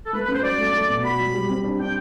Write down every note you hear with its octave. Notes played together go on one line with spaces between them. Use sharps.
A4
A3 B4
B4
F#2
C5
F#3 D5
A3
A3
B2
F#4 B5
F#3
G3
C4
D4
D4 G5